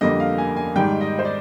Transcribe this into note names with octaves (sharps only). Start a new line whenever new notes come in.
F2 D3 G3 A#3 D#5
F5
G#5
G#5
G#2 D#3 G3 G5
D#5
C5
D5